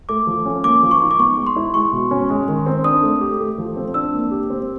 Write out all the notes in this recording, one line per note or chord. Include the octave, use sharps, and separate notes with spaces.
A3 D6
F3
C#4
A#3 D6
F3
C#6
D#4
D6
B3 C#6
G#3
C6
E4
G#3 C#6
B2
C#4
G#3
D#3
C4
D4 D#6
A3
G4
A3
F3
C4
D4 E6
A#3
G4
C4